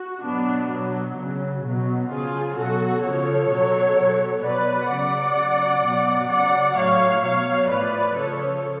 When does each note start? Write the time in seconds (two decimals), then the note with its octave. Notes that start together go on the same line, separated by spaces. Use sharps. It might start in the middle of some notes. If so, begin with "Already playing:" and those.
Already playing: F#4
0.23 B2 F#3 B3 D4
0.70 B2 F#3
1.16 C#3 F#3
1.64 B2 F#3
2.10 C#3 F3 F4 G#4
2.56 B2 F#3 F#4 A4
3.03 C#3 F3 A4 C#5
3.50 B2 F#3
3.96 B2 F#3
4.42 B2 F#3 B4 D5
4.89 C#3 F#3 D5 F#5
5.36 C#3 F#3
5.83 B2 F#3
6.29 C#3 F#3 D5 F#5
6.76 A2 F#3 C#5 F5
7.23 B2 F#3 C#5 F5
7.69 A2 F3 B4 D5
8.16 C#3 F3 A4 C#5